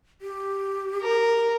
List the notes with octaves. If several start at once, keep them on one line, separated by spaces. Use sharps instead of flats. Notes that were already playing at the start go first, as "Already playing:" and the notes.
G4
A#4